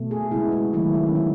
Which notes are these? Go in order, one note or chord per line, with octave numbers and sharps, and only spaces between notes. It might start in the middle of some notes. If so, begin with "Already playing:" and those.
Already playing: B2 A3
G#4
C#3 G#3 B3 E4
F#4
D#3 F#3 A3 E4
E4
C#4
E3 A3 D#4